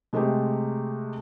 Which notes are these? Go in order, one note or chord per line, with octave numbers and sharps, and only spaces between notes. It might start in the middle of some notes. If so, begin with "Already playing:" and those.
C3 G#3 A3 C4 G4